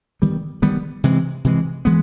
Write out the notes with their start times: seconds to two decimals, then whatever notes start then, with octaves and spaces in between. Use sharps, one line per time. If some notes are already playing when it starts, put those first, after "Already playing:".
0.22 D#3 G3 B3
0.62 D#3 G3 B3
1.04 C3 E3 G#3
1.44 C3 E3 G#3
1.85 E3 G#3 B3